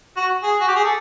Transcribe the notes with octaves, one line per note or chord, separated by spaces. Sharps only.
F#4
G#4
F#4
G4
G#4
A4